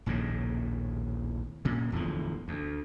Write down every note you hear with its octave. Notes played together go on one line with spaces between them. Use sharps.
A#1 D#2 A2 C#3
A#2 C#3
D1 E2 D3 F3
D2